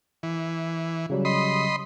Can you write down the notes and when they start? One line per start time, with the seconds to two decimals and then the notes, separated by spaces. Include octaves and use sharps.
0.23 E3
1.10 C#3 F#3 G3
1.25 D#5 B5 C6